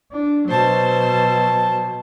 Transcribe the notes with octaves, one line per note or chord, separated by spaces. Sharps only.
D4
B2 F#3 C5 A5